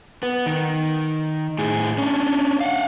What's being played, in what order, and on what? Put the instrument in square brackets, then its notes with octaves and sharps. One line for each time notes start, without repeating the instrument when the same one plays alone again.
[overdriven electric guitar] B3
D#3
A2 G#4
C#4 D4
F5 F#5